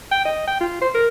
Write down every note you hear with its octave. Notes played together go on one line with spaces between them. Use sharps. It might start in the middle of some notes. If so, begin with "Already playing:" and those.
G5
D#5
G5
F4
C5
A#4